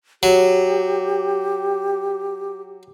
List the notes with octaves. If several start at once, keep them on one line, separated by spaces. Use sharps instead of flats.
F#3 G4